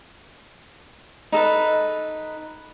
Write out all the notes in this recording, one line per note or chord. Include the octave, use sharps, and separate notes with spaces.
D#4 A4 B4